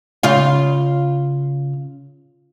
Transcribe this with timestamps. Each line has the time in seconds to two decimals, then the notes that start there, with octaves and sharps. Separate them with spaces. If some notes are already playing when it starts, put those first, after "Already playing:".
0.23 C#3 F4 F5